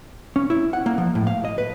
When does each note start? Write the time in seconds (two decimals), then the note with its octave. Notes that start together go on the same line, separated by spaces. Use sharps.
0.36 C#4
0.50 E4
0.73 F#5
0.86 A#3
0.98 F3
1.15 A2
1.27 F5
1.45 D#5
1.58 B4